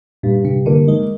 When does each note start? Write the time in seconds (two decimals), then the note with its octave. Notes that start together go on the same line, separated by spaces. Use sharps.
0.23 G2 A#2
0.45 G2 C3
0.66 D3 A#3
0.87 D#3 G#3